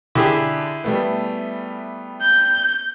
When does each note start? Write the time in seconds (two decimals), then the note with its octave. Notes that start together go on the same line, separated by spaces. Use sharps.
0.15 D3 E4 G4 G#4
0.84 G3 A3 B3
2.21 G6